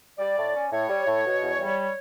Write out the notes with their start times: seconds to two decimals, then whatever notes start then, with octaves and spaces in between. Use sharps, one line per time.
0.18 G3 D5
0.36 A2
0.54 C#4
0.71 A2 C#5
0.88 G3
1.06 A2
1.24 B2
1.41 E2
1.59 G3